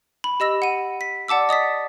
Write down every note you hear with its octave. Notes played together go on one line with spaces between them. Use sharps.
B5
G4 D#5 E6 A#6
F#5 D#7
B6
D5 F#5 A5 D6 E6
D#5 D#6 A6 B6